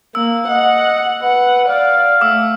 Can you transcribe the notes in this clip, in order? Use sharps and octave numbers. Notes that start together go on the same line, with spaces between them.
A#3 E6
D#5 F#5
B4 F#5
D5 F5
A3 D6 E6